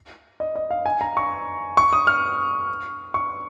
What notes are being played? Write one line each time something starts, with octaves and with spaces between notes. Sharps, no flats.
D#5
D#5
F5
G#5
A#5
C#6
C#6
D#6
F6
C#6